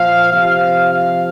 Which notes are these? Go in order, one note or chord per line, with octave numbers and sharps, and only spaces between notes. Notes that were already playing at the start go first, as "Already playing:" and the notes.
Already playing: A#2 F3 F5
C3 F3 F5
F5